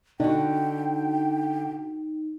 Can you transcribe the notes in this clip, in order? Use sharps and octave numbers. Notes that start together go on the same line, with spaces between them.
D3 D#4 F#4 G5